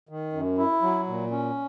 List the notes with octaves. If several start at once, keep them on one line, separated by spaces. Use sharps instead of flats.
D#3
F#2
E4
F#3
A#2
C#4